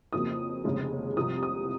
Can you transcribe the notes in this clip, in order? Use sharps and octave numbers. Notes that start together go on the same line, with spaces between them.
F2 C#3 F#3 A#3 D#6
F1 D#2 C#3 G#3
C2 C3 F3 D#6
D#6